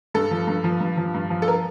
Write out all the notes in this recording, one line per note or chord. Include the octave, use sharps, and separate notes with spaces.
G2 A4
F3
G2
F3
G2
F3
G2
F3
A4
A#4